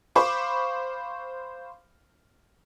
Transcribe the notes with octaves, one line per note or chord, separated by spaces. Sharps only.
C5 F5 B5 C#6 D6